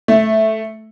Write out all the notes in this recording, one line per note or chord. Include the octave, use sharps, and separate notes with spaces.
A3